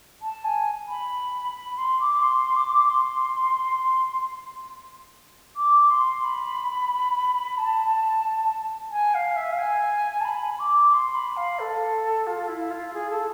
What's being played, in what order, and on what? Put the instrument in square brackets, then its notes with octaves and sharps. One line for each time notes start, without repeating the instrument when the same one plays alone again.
[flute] A5
G#5
B5
B5
C6
D6
C6
D6
C6
D6
C6
B5
A5
G#5
F5
E5
F5
G#5
A5
B5
D6
C6
B5
F5
A4
F4
E4
F4
G#4
A4